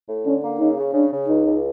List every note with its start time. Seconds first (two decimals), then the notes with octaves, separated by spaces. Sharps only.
0.08 A2
0.26 D3 C#4
0.43 A#3
0.60 C#3 D#4
0.77 C#3
0.94 C#3 D4
1.12 C#3
1.28 C#2 D#4
1.45 C#2